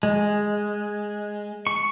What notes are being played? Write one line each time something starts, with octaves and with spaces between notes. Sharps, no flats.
G#3
C#6